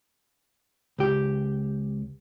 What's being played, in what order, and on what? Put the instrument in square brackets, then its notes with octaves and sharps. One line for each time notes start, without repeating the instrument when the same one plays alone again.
[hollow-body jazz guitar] C#2 G4